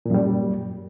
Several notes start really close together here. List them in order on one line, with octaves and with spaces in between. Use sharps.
A#2 F#2 G3